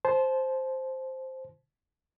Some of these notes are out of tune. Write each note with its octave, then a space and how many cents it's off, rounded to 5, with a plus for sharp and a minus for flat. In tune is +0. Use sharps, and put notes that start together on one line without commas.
C5 +0 A5 -30